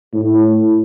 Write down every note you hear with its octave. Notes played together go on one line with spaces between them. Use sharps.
A2